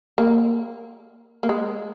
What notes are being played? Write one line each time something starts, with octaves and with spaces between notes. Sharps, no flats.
A#3
A#3
G#3